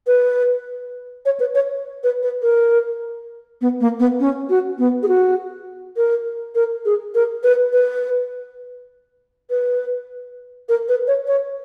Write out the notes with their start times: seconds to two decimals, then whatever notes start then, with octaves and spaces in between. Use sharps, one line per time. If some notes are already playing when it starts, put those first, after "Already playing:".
0.07 B4
1.26 C#5
1.40 B4
1.55 C#5
2.04 B4
2.23 B4
2.42 A#4
3.61 B3
3.81 A#3
4.00 B3
4.20 C#4
4.50 F#4
4.79 B3
5.03 G#4
5.08 F#4
5.97 A#4
6.55 A#4
6.85 G#4
7.15 A#4
7.43 B4
7.73 B4
9.50 B4
10.69 A#4
10.89 B4
11.07 C#5
11.27 C#5